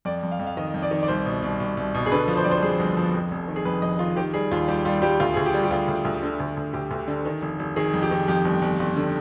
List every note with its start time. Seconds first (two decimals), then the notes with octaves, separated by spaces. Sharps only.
0.05 F2 D5
0.23 F2
0.32 F5
0.39 F2
0.47 F5
0.57 D#3 D#5
0.74 F2
0.82 D5
0.91 D#3
1.03 D5
1.08 C2 C5
1.25 B2
1.42 C2
1.60 C2
1.77 C2
1.94 B2
2.06 G#4
2.12 D3 B4
2.28 F3
2.37 C5
2.44 F2 D5
2.51 C5
2.62 F2 G#4
2.80 G1
2.97 F3
3.14 F2
3.31 F1
3.48 D#3
3.56 G#4
3.65 F2 B4
3.82 F1 D#5
3.99 D#3 F4
4.17 D#3 G4
4.33 G3 G#4
4.51 D#2 F4
4.68 G3 G4
4.85 G3 F4
5.02 G3 G4
5.20 D2 F4
5.34 D2 G#4
5.46 G4
5.54 G3
5.64 G4
5.71 D2 F4
5.88 D2
6.05 D2
6.23 D3
6.40 D2
6.57 D2
6.73 D2 G4
6.91 D2
7.08 D3
7.25 D#3
7.42 F1
7.59 F1
7.76 D#3 G#4
7.94 F2
8.03 G4
8.11 D#3
8.28 F2 G4
8.45 G1
8.62 G1
8.80 G1
8.96 D3